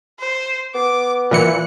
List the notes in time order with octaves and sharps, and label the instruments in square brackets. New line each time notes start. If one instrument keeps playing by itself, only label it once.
[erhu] C5
[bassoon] B3 [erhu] D6
[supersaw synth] A#2 E3 C#7 [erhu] F#6